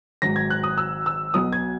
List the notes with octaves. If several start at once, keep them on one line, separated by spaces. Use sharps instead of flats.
G#1 G#2 F#3 A#6
G#6
F#6
D#6
E6
E6
B1 B2 F#3 D#6
G#6